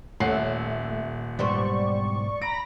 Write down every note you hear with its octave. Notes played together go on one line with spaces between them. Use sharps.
D#1 A#2 A3 C#4 E5 F#5 C7
B1 G#2 G3 B3 C4 C5 D5 C#6
A#5 B5 A#6 D7